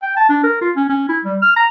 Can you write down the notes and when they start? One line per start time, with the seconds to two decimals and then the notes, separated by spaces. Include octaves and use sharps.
0.03 G5
0.17 A5
0.29 D4
0.43 A#4
0.61 F4
0.76 C#4
0.89 C#4
1.09 E4
1.25 G3
1.42 F6
1.56 A#5